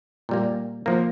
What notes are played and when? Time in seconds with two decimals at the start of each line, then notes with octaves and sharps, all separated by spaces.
0.29 A#2 G3 A#3
0.86 F3 A#3